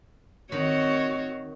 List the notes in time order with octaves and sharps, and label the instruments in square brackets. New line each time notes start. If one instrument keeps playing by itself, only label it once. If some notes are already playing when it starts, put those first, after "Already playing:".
[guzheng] D#3 [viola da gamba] C4 F#4 C#5